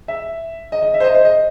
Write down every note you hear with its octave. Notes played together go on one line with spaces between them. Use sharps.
E5
D#5
D#5
E5
C5
D#5
C5
D#5